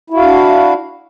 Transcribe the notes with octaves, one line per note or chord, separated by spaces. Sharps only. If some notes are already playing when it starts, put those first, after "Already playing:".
D4 E4 F#4 F5